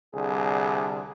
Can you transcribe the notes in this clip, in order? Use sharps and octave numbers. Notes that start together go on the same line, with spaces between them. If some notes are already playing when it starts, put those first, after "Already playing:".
C2 D3 G#4